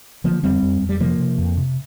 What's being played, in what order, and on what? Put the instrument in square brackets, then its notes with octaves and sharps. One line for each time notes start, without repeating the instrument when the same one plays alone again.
[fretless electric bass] D3 F3 A#3
F2 G3 C4
F2
F2
G3
C3 F3 A#3
C3
F2
C3